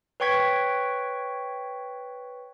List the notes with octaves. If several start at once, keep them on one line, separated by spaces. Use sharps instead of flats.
B4 C#5 G5 C#6 G#6 B6